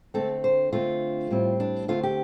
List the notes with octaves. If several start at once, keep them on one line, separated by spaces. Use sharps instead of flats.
D3 A3 C4 A4
C5
D3 A3 C4 F4
A2 G3 C4
D4
D3 A3 C4 F4
G4